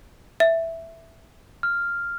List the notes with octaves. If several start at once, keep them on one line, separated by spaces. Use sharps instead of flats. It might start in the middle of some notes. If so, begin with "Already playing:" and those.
E5
F6